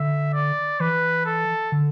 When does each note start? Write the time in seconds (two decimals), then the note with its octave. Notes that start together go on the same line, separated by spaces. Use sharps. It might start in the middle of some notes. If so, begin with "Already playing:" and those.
Already playing: D3 E5
0.34 D5
0.80 E3 B4
1.26 A4
1.72 D3